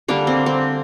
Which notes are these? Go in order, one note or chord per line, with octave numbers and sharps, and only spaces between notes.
D3 G3 A#3 D4
C4
C4